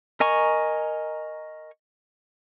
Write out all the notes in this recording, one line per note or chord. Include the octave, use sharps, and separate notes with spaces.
A#4 D#5 G#5 A#5 C#6